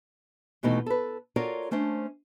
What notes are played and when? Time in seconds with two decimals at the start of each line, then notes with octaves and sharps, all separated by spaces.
0.63 D#2 B2 E3 A3 D#4
0.86 A4 B4
1.36 F4 F#4 A4 A#4 C#5 D5
1.71 A3 C#4 D4 C5